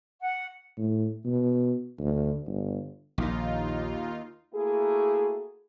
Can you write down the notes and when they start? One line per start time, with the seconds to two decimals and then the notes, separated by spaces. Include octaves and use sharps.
0.21 F#5
0.77 A2
1.25 B2
1.99 D2
2.46 G1
3.18 A#1 D#2 A#2 D#4 F4
4.54 A3 A#3 E4 F#4 G#4